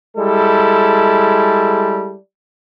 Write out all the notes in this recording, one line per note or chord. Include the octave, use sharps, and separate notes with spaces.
G3 G#3 E4 A4